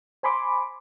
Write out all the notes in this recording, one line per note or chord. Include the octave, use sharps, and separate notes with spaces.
C5 G#5 B5 C6 D6